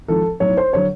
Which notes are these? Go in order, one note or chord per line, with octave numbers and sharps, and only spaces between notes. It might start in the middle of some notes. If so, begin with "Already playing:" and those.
G#1 G#2 F3 A4
B1 A2 F#3 C#5
C5
D3 F#3 C#5